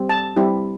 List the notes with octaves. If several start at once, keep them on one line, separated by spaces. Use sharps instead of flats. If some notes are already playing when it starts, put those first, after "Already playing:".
Already playing: G3 C4 G4
A5
G3 C4 E4 G4